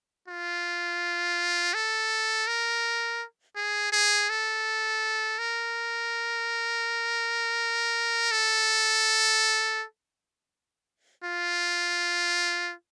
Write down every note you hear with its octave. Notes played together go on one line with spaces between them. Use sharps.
F4
A4
A#4
G#4
G#4
A4
A#4
A4
F4